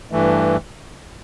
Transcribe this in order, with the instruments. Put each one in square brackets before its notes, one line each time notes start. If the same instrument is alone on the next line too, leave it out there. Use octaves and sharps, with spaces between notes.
[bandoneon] G2 E3 A3